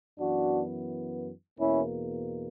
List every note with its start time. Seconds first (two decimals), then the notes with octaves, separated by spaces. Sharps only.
0.18 F#2 E3 B3 D4 F#4
1.59 E2 B2 A#3 C#4 E4